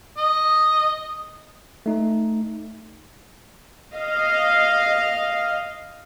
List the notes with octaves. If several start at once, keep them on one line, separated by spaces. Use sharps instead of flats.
D#5
A3 D#4
D#5 F5